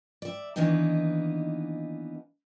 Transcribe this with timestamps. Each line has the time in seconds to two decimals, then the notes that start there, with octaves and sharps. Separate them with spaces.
0.22 D5 E5
0.56 D#3 E3 A#3 B3 D4 D#4